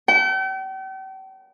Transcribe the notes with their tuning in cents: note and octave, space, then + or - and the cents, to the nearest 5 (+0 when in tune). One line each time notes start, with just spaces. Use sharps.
G5 -40